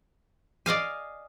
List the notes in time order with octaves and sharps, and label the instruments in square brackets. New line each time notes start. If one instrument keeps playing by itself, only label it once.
[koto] D5 D#5 F5 G#5